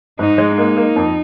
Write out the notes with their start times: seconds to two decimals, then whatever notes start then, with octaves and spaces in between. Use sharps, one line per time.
0.19 G#2 D#4
0.38 G#3
0.57 A#3 D#4
0.77 A#3
0.96 F2